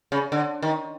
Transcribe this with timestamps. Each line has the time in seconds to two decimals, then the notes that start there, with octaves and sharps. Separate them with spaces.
0.12 C#3
0.32 D3
0.62 D#3